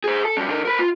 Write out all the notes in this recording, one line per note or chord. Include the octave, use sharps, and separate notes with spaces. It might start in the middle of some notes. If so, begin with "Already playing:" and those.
G#4 C5
A4
G2 C#4
D3 A#4
A#4 B4
F4